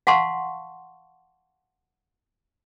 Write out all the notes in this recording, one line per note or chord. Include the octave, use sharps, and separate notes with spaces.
F5 F#5 A5 C6 C#6